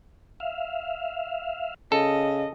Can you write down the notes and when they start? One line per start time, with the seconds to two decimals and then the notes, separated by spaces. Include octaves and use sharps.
0.40 E5 F5
1.92 C#3 A4 D#5